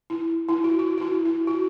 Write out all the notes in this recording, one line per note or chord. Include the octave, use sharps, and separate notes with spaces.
E4
E4
F#4
F#4
F#4
E4
E4
F#4